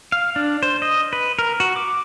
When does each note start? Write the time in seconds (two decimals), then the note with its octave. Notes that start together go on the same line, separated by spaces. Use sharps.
0.12 F5
0.36 D4
0.63 C5
0.82 D#5
1.13 B4
1.39 A#4
1.60 F#4
1.76 D6